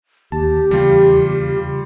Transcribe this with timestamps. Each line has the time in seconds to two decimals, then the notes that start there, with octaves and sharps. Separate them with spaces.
0.32 D#2 G4 A5
0.71 E2 C#3 G3 F4
1.18 E2